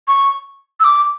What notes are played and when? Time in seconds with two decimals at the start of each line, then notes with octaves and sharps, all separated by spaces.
0.08 C#6
0.80 E6
0.84 D6